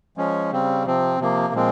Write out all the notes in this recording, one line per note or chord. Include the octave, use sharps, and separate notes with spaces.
F3 G#3 C#4
C#3 G3 C4
C3 F3 C4
C3 F3 A#3
A#2 F3 G#3 C4